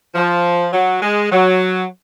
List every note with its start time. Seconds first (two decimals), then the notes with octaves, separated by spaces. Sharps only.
0.14 F3
0.73 F#3
1.02 G#3
1.31 F#3